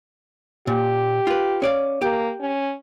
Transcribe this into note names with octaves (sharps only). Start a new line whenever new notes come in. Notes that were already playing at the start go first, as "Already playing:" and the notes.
A#2 G4
F4 B4
C#4 D5 F5
A#3 G4
C#4